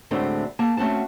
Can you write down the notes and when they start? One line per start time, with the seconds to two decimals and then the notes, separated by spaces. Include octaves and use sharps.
0.11 D2 A2 G#3 A3 C4 D4
0.59 A#3 A5
0.77 A3 C4 C#4 F#4 A5